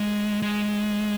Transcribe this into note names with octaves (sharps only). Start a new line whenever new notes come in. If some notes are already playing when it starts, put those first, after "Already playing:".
Already playing: G#3
G#3